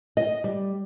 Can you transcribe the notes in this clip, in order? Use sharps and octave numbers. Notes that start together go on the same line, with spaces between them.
D#5
G3